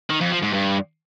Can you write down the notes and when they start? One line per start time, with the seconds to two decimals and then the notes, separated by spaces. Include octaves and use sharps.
0.10 D#3
0.21 F2
0.31 F3
0.42 G#2
0.53 G2